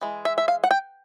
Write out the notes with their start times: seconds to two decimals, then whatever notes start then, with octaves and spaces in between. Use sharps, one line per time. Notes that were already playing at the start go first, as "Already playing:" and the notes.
0.01 E3 G#3
0.25 E5
0.38 E5
0.48 F5
0.64 F#5
0.71 G5